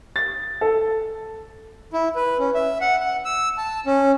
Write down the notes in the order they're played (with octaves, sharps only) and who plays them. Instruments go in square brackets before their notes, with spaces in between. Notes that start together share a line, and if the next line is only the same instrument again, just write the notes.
[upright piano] A6
A4
[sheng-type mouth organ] E4
B4
C#4
E5
F#5
F#5
E6
A5
C#4